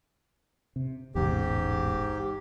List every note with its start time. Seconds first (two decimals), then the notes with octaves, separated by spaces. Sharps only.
0.76 C3
1.15 E1 A1 E2 G#2 G4